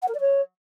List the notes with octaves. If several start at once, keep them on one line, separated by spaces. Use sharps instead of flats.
F#5
A#4
D5
C#5